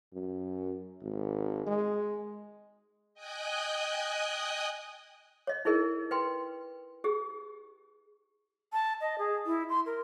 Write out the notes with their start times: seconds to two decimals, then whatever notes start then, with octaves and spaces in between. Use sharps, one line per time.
0.13 F#2
1.02 G#1
1.67 G#3
3.14 D#5 G5 G#5 D#6 F#6 G6
5.47 C#5 D#5
5.65 D#4 E4 G#4 A#4 D#5
6.11 B4 G5 C6
7.04 G4 G#4
8.73 A5
9.01 D#5
9.19 G#4
9.46 E4
9.70 C6
9.86 A#4